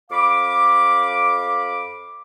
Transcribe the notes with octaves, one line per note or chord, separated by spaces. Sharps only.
F2 F5 B5 D6